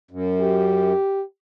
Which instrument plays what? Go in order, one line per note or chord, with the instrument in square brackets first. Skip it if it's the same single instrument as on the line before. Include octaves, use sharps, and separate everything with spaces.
[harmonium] F#2
[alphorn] G4